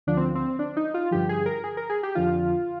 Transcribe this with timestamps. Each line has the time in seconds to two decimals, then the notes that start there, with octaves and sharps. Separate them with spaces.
0.07 D2 D3 F3 D4
0.17 C4
0.35 C4
0.59 D4
0.77 D#4
0.94 F4
1.11 G2 D3 F3 G4
1.29 G#4
1.46 A#4
1.64 G#4
1.77 A#4
1.90 G#4
2.03 G4
2.15 F2 D3 F3 F4